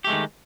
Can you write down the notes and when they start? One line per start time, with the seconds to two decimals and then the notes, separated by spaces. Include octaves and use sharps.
0.04 G4
0.07 A3
0.10 G#3
0.12 D#3